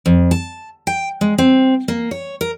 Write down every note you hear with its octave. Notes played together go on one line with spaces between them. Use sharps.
F2
A5
G5
G#3
C4
A#3
C#5
A#4